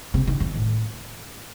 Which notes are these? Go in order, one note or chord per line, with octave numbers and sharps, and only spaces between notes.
C3
D#3
F2
A2